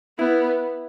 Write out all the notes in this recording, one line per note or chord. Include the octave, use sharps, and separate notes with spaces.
B3 E4